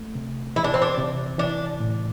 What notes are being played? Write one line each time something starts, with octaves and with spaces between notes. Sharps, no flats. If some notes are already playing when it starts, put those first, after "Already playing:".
Already playing: A3
C3
E3 E4
D4
C4
D4
C3
E3 D4
A2